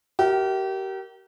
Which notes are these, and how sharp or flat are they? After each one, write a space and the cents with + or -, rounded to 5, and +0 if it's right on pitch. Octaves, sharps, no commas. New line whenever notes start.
G4 -35 A#4 +0 E5 +0